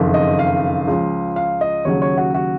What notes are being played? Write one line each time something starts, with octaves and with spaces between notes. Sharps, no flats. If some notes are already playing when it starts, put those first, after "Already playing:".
Already playing: F#1 F2 D#3
D#5
F5
C#2 C#3 F3
F5
D#5
D#2 C#3 F#3 C#5
C#5
F#4
F#4